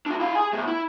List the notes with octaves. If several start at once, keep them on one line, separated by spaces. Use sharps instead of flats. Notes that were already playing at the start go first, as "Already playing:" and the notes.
D4 F#4
E4 F5
G#4 G#5
B2 A3
E4